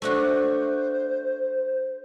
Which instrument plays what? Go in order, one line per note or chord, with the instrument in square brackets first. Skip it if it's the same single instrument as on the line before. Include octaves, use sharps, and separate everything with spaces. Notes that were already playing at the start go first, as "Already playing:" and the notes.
[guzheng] A3 D4 F#4 [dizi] C5